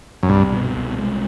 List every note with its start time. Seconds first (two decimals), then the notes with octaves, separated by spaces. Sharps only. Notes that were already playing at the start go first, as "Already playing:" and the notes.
0.23 F#2
0.29 C2 G2
0.52 B2
0.76 C2
0.99 G#3